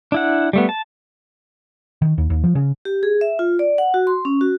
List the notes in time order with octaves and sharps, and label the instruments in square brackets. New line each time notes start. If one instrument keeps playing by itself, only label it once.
[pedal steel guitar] D4 E4 F#5
G3 A3 B3
A5
[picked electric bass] D#3
D#2
D#2
F3
C#3
[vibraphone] G4
G#4
E5
F4
D5
F#5
F#4
C6
C#4
F#4